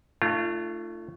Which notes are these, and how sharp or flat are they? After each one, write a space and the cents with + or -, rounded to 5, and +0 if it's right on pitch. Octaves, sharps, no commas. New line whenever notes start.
A3 +15 D4 +45 F4 -25